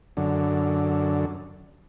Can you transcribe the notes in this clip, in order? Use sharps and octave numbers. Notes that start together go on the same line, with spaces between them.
F#2 D3